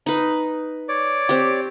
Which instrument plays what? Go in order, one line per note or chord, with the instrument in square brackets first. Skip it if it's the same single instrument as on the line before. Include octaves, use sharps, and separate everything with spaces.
[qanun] D#4 B4
[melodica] C#5 D5 D6
[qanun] C4 G4